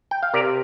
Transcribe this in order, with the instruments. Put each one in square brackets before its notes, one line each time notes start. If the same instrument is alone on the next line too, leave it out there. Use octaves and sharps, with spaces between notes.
[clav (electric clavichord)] G5
F5
C3 A#4 D5